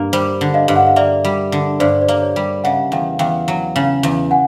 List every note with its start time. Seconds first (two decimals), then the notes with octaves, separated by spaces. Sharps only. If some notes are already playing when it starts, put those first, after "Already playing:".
Already playing: G2 A#3
0.13 G3 C5
0.41 D3
0.54 D#5 F5
0.68 G2
0.76 F#5
0.86 F5
0.96 A#3 D5 E5
1.25 G3
1.52 D3
1.80 G2 C5 D5
2.01 C5 D5
2.08 A#3
2.22 C#5
2.36 G3
2.64 C#3 E5 F#5
2.92 E2 F5 G5
3.19 E2 F5 G5
3.48 F#3
3.76 C#3
4.03 E2
4.31 F#5 G#5